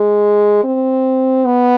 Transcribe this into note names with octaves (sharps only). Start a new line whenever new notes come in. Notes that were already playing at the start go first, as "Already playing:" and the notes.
Already playing: G#3
C4
B3